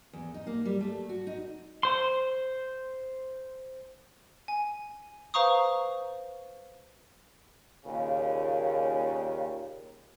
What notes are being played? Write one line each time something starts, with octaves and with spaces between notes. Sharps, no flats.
E2
D#4
A#3
G3
A3
F#4
D#4
C5 C6
G#5
B4 C5 F5 A#5 C#6 D#6
D#2 A#2 C#3